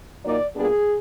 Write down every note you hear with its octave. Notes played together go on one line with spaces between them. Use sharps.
A#2 F#3 A#3 D#4 D5
A#2 G3 B3 D4 G#4